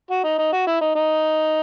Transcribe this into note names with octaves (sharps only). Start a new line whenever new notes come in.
F#4
D#4
D#4
F#4
E4
D#4
D#4